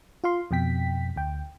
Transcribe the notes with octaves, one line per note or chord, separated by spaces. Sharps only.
F4 F5 C6
F2 B2 G5 B6
D2 G5